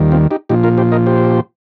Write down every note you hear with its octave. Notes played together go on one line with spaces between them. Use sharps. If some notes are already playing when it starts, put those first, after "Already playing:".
Already playing: D#2 D#3 G3
C4 F4
D#4 G4
A#2 F3 D#4 G4
F4 A#4
G4 C5
A#4 D#5
G4 C5